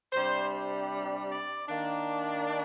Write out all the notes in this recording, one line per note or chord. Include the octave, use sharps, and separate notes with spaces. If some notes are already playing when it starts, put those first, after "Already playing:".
C3 G3 D4 C5
D5
D#3 A#3 D4